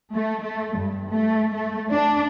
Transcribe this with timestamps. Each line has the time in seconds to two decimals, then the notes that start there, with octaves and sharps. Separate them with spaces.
0.13 A3
0.42 A3
0.78 G2
1.10 A3
1.53 A3
1.91 D4